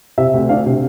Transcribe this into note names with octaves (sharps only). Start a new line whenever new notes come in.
C3 E5
D2
D4 F5
C3